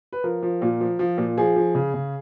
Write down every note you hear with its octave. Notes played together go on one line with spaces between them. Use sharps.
B4
F3 A#4
F3
A#2
F3
F3
A#2
F3 G#4
F3
C#3
C#3